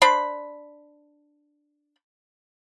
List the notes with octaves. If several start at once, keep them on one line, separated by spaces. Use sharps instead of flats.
D4 C5 B5